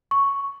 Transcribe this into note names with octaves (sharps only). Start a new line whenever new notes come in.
C#6